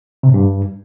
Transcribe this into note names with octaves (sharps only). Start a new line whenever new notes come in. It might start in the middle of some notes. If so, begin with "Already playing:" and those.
C3
A2
G2